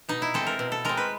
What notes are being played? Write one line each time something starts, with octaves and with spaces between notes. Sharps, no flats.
B2 D#4
E4
G#3 C4 A4
A#4
B2
A4
G#3 C4 A#4
B4